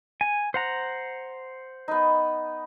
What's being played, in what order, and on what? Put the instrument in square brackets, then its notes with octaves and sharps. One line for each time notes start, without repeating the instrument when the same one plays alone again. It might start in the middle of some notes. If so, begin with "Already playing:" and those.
[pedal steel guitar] G#5
C5 F#5 A#5
[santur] B3 D#4